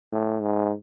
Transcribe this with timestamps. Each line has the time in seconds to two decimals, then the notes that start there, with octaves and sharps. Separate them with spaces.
0.13 A2
0.42 G#2